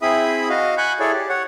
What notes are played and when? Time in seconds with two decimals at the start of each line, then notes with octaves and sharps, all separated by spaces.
0.02 C4 E4 G#4 E5 B5 D#6
0.49 F#4 D#5 F5
0.78 F#5 G#5 B5 C#6 F#6 G6
0.99 E4 G#4 A4 C#5 D5
1.12 G4
1.29 C#5 F#5